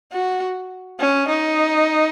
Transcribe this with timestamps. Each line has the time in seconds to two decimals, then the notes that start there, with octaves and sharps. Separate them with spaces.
0.13 F#4
1.00 C#4
1.28 D#4